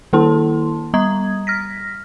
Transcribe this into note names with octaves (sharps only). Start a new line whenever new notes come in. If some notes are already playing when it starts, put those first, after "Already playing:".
D#3 A#3 E4 A4 A5 C6
G3 A#5 D#6 G#6
F6 A#6 B6